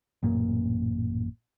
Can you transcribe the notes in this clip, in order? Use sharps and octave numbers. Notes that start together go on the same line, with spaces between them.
A1 F#2 A#2 A#3